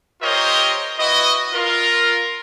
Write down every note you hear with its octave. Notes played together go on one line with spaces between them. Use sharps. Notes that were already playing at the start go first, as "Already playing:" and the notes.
F4 G4 A#4 C5 C#5 D#5
E4 F#4 B4 D#5
F4 A#4